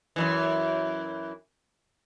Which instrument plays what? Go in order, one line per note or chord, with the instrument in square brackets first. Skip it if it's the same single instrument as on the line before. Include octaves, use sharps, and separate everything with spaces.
[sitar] F#2 A#2 E3